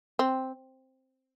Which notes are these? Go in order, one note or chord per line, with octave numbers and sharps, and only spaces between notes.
C4